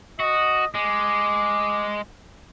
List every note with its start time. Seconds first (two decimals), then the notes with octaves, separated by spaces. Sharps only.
0.20 F#4 D#5
0.75 G#3 D6